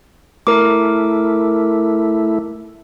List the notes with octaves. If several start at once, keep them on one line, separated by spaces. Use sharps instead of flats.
A3 E4 A#4 D6